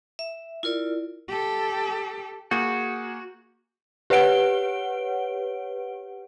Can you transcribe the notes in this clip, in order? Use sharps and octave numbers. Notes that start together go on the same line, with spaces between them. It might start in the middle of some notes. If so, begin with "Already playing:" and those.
E5
E4 F4 A#4 D5
G4 A4
A#3 F#4 G#4 G6
G4 B4 C#5 F#5 D7 G7